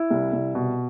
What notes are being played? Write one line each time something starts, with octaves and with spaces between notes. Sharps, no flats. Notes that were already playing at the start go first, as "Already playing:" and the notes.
Already playing: E4
C2
C2
B2